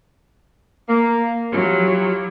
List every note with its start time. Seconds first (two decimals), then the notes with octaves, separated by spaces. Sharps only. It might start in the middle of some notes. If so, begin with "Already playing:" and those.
0.88 A#3
1.51 F#3 E4 F4 G4